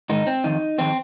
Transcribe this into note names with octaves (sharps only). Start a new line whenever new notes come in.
G#2 D#3 D#4
C4
F2 D#3 D#4
F2 D#3 C4